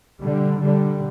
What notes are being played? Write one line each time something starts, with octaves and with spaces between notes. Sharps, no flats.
D3 G3
D3 G3